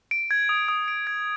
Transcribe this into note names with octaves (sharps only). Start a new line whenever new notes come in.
D7
G#6
D#6
D#6
D7
G#6